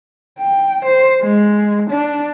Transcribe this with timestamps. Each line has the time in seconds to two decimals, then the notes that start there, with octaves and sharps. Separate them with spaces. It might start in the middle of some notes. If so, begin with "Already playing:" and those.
0.39 G5
0.85 C5
1.22 G#3
1.90 D4